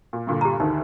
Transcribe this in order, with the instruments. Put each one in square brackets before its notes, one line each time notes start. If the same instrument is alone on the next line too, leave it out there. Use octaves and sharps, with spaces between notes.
[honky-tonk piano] A#2
G2 A#2 D3
[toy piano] G4 A#5
[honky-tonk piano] D2 D3 D#3 [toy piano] D#4